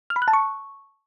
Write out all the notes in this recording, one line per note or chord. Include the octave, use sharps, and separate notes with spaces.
F6
B5
F#6
A5
C#6